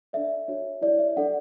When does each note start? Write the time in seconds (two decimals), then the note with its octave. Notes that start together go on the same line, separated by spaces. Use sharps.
0.13 D4 A4 D5 E5
0.48 D4 F#4 C#5
0.81 E4 G4 C#5 D5
0.99 E5
1.17 D4 A4 D5 F#5